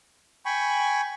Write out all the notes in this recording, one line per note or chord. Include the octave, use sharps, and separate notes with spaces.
G5 G#5 B5 C#6